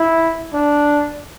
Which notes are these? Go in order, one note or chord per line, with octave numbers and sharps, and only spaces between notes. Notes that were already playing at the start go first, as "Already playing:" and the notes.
Already playing: E4
D4